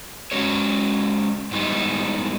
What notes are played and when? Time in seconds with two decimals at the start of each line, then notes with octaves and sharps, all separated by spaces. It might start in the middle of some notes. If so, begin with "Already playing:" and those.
0.32 G#3 C#4 F#4 A4 C#5
1.51 G#2 E3 G3 B3 D#4